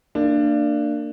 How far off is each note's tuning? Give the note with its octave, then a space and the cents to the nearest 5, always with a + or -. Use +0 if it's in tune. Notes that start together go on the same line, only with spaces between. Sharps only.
A#3 -30 D4 +15